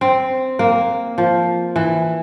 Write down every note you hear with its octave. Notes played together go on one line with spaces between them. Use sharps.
C4
A#3
F3
E3